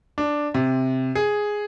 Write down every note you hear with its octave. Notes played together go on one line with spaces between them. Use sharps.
D4
C3
G#4